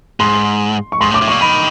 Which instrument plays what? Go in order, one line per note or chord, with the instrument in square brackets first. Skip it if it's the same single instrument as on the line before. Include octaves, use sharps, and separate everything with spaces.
[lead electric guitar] G#2 [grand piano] C6
[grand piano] C#6
[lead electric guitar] G#2 [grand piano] C6
[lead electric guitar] A2
[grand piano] D6
[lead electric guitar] A2
[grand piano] C#6
[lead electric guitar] A#2
[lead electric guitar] D#3 [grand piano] B5